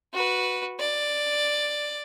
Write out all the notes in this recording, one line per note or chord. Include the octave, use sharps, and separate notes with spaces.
F#4 B4
D5